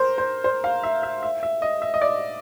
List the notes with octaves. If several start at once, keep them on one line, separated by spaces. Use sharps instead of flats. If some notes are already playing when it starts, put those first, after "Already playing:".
Already playing: A#4 C5
C5
C5
F5
E5
E5
E5
E5
D#5
E5
D#5
D5